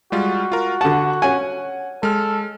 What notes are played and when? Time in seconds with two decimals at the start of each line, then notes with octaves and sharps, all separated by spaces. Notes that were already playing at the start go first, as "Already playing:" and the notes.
0.12 G3 G#3 F4 F#4
0.52 F4 A#4
0.81 D3 F#5 A5
1.22 C#4 F#5 G#5
2.03 G#3 A4 F6